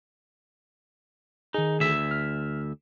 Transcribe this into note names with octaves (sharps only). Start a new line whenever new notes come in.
D#3 D#4 G#4
D2 E5
F6